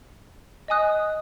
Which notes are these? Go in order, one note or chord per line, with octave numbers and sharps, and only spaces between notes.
D#5 G#5 D#6 F#6